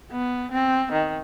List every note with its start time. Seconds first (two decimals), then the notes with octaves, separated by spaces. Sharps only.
0.11 B3
0.51 C4
0.92 D#3